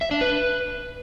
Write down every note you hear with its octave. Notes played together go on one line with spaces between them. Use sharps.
E5
D4
B4